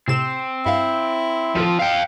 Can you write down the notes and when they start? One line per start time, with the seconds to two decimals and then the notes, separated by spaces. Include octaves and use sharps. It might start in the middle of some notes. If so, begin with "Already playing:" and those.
0.08 A2 C3 C4 E7
0.66 G2 E4 F5
1.55 D#2 A2 F3
1.79 F5 G5